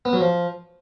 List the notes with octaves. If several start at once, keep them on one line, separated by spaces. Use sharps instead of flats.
B3
F#3
F3